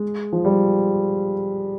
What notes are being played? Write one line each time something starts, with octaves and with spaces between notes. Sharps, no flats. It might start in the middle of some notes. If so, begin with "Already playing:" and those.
Already playing: G#3
F3
G3